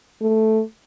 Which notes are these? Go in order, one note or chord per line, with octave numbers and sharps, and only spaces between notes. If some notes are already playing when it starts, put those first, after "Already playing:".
A3